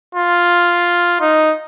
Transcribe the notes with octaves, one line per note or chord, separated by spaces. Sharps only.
F4
D#4